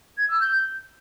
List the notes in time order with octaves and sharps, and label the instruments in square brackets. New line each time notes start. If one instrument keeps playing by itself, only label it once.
[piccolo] G#6
E6
G6